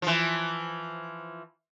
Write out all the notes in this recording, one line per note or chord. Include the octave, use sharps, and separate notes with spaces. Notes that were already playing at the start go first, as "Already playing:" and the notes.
E3 F3